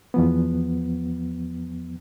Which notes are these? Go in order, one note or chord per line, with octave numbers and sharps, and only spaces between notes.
E2 F3 B3